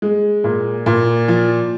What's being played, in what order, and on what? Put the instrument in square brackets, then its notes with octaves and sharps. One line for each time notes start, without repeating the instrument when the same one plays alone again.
[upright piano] G#3
A#2
A#2
F3